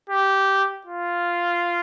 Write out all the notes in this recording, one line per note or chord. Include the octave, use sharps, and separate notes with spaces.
G4
F4